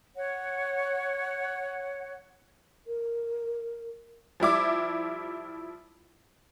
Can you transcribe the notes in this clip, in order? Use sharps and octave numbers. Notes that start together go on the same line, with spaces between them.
C#5 F#5
A#4
F3 G3 E4 D6